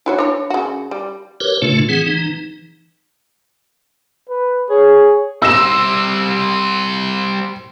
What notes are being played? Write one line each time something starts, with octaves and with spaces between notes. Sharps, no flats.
E4 F#4 C#5
D4 C#5
C#3 F#4
G3
G4 A#4 B4 C#5
A2 C#3 A3 D4 F4
E3 C4 G#4 F#5
E3 D#4
B4
G#4 C#5
G3 C4 E6 A#6 E7